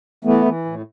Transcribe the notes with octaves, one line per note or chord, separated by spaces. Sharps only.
E3 A3 B3
E3
A2